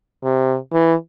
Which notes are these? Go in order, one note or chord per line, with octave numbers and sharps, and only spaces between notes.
C3
E3